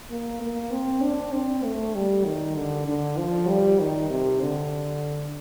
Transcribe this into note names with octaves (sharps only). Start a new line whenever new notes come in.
A#3
A#3
C4
D4
C4
A3
G3
D#3
D3
D3
F3
G3
D#3
C3
D3